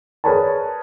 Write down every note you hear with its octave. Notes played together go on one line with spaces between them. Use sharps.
G#4 A#4 B4 C#5 D5 A5